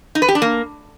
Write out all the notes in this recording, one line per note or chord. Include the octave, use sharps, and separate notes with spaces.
D#4
B4
G4
D4
A#3